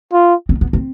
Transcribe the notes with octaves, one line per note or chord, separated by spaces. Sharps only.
F4
C4
B3
C4